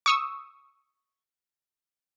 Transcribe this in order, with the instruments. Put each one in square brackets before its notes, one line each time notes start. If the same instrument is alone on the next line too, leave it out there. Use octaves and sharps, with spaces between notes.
[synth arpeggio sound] C#6 D#6 E6